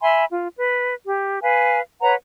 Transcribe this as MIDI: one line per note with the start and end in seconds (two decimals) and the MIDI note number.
0.01 0.24 76
0.01 0.24 80
0.01 0.24 83
0.01 0.24 84
0.32 0.47 65
0.56 0.94 71
1.06 1.42 67
1.42 1.79 71
1.42 1.79 77
1.42 1.79 80
2.01 2.15 71
2.01 2.15 73
2.01 2.15 78
2.01 2.15 82